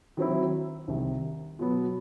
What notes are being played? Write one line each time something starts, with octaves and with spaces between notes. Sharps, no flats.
D#3 F#3 C4 E4
C2 C3 D#3
B2 F#3 B3